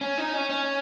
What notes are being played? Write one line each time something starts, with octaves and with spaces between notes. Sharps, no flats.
C#4
D#4
C#4
C#4